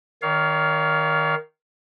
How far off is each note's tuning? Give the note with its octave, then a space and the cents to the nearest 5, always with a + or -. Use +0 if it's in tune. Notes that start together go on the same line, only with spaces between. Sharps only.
D#3 +0 C#5 +40 F5 +0